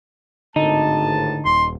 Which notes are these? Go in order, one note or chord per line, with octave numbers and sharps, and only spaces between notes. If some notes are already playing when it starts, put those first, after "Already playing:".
G#1 A2 D3 D#4 A5
D#1 C6